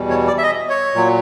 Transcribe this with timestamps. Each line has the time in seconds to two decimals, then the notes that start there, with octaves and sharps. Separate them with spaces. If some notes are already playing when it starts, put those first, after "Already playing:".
Already playing: E2 B2 G3
0.10 C#5
0.27 D5
0.38 E5
0.43 D#5
0.70 C#5
0.95 A#2 F#3